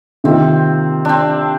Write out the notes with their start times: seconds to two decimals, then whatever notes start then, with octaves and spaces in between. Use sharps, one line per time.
0.24 C3 D#3 A#3 C4 F4
1.05 C4 D4